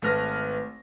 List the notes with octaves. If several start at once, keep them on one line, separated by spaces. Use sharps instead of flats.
G#1 A3 B4 F6 A#6